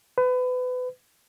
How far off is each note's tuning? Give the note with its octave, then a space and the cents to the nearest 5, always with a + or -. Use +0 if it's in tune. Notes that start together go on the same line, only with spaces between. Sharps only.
B4 +30